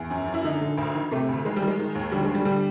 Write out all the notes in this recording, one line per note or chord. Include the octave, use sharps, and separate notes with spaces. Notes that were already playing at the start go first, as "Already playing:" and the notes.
Already playing: E2
F#2
F#2
E4
D3 D#4
D3
D2
D#3
C3 A3
D2
D#3 G#3
G3
D#3
G#3
D#3
D#2
D3 G3
G#3
D3 G3
D3 G3